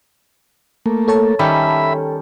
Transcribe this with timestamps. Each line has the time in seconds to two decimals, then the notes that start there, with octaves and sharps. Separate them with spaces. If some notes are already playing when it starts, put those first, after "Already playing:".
0.86 A3 A#3
1.08 A4 C#5 A5
1.39 D#3 G3 C#4 E5 B5